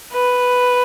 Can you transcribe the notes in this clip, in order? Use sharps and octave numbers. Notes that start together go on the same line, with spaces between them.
B4